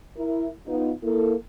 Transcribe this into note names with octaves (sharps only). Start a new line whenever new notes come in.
E4 A#4
B3 D#4 F4
A#3 E4 A4